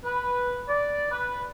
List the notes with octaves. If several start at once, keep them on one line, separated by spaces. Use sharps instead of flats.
B4
D5
B4